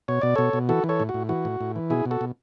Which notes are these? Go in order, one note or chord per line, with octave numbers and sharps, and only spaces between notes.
B2 C#5
B2 D5
B2 A4 C#5
B2
E3 F#4 A4
E3
A4 C#5
A2
F#4
A2
E3 F#4
A2
A2
E3
B2 E4 G#4
B2
F#4 A4
B2